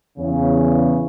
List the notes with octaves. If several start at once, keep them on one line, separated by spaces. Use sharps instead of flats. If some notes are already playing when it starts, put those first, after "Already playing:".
E2 C#3